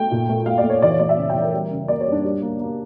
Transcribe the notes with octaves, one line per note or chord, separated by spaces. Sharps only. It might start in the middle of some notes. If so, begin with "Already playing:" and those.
Already playing: A3 G5
A#2
A3
A3 F5
D5
A3
C#5
E3 D5
C#5
A3 D5
E5
C#3
G5
E3
A#4
G3
C#3
A#3 D5
C#5
G3
D4
G3
A#3
A#3